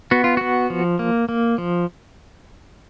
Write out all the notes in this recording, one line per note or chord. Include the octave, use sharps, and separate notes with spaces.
B3 F#4
F4
B3 F#4
F3
A#3
A#3
F3